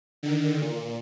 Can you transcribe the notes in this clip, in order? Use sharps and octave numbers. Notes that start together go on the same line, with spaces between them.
D3 D#3
A#2